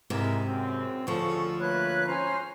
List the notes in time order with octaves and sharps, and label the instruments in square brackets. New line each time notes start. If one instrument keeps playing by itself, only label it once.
[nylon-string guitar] G#2 C3 [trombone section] G#3 E4 A#4
[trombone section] F#2 C4
[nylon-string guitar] D2 F3 [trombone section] C#3 A4 [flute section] C#6
[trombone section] A3 A#3 B4 [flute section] C#5 B5 F#6
[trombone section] G#1 C#4 [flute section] C5 G#5 A#5